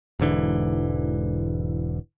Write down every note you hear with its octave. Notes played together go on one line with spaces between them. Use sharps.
E1 G#2 D3 E3